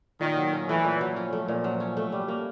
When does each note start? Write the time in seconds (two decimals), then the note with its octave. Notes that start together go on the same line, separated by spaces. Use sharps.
0.20 A#2 D#3
0.37 F#3
0.53 C#4
0.68 E3 A3
0.84 A#2
1.01 F#3
1.16 F3 C#4
1.33 A3
1.48 A#2
1.64 F#3
1.80 C#4
1.97 A3
2.12 G3
2.28 A#3